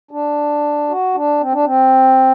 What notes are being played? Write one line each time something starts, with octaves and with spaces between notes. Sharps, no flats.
D4
F#4
D4
C4
D4
C4